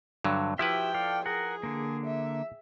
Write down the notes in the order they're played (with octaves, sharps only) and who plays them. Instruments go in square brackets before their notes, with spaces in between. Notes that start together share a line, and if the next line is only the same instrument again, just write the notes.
[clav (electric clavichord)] G2 D3 F#3
[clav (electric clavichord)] F3 E4 B4 [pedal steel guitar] F#4 G4 E5 [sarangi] G5
[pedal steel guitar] A4 D5 F5
[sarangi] G#4 [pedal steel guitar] A#4 F#5
[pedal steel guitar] D3 A#3
[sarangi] E5